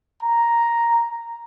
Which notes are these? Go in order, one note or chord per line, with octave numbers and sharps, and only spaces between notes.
A#5